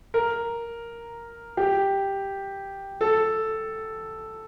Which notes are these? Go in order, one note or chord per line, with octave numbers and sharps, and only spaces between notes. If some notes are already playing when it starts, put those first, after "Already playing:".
A#4
G4
A4